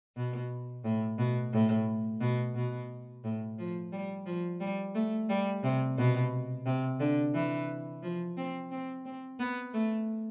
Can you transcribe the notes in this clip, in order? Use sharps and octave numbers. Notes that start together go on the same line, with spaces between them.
B2
A2
B2
A2
B2
B2
A2
F3
G3
F3
G3
A3
G3
C3
B2
C3
D3
E3
F3
C4
C4
C4
B3
A3